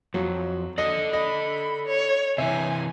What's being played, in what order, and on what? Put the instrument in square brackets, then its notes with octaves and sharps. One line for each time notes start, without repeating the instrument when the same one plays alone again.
[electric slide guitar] F2 [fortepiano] F#3
[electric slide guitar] A4 D5 [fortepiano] D#5
[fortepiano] D#5 [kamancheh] B5
[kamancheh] C#5
[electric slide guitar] C3 E3 [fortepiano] E5 [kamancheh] G#5